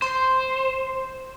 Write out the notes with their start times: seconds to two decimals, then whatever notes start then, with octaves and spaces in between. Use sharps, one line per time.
0.02 C5 C6